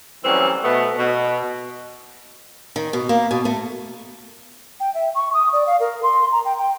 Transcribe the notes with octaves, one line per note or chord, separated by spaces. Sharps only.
E3 F#3 G3 A3 C4 C#4
B2 A3 B3
B2
D#3
B2
A#3
B2
A3
G5
E5
C#6
D#6
D5
F5
A#4
C6
A#5
G5
G5